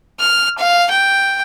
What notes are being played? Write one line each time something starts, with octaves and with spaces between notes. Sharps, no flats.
F6
F5
G5